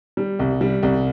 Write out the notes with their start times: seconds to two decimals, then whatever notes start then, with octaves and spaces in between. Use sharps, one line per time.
0.17 G3
0.39 C2
0.61 G3
0.83 C2